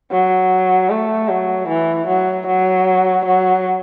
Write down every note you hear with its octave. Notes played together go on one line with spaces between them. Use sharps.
F#3
A3
F#3
E3
F#3
F#3
F#3